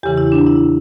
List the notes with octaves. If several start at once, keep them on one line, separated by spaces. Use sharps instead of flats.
E2 C#3 E3 G4
E4
D4
E4